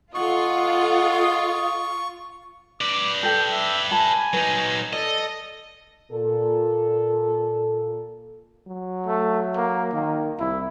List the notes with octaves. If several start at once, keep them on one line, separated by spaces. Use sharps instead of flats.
F4 A4 D#5 F#5 C#6
B4 D5 D6
A4 G5 G6
E5
G#5 A5 B5
F#3 D#4 B4
A4 D5 D#5
A#2 A4
F#3
A3
A#3
D#3 A#3
C2 E4